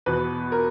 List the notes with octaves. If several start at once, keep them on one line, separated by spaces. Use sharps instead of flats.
E2 B2 B4
A#4